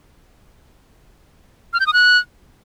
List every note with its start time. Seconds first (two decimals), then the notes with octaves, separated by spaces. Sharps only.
1.73 F6
1.80 G6
1.87 D#6
1.93 F#6